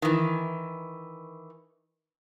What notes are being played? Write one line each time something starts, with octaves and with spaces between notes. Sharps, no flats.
D#3 E3